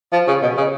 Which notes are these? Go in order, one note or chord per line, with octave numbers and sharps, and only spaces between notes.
F3
C#3
B2
C#3